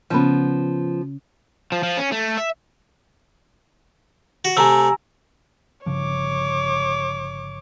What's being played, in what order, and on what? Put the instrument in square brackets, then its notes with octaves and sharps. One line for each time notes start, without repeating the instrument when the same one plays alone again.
[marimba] C#3 C#4 B5 [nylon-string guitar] F3 B3
[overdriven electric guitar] F3
F3
C#4
A3
E5
[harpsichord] F#4
[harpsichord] C3 A3 [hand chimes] G#5 A#5 E6
[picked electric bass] G1 C#3 F3 [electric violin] C#5 D6